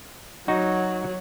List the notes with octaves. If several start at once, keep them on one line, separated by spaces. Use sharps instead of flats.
F#3 D#4 F#4